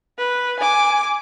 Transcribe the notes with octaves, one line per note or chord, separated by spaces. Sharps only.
B4
G#5 D6